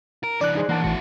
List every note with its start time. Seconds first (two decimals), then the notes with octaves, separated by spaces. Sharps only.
0.24 A#4
0.41 E3 D4 D5 F#6
0.55 D#4 G#4 C5
0.69 E3 A#3 D4 F#5 A5
0.84 A1 A2 E4 F#4